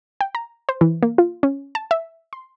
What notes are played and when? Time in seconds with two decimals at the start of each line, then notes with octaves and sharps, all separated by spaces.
0.21 G5
0.35 A#5
0.69 C5
0.81 E3
1.03 A#3
1.18 F4
1.43 C#4
1.75 A5
1.91 E5
2.33 C6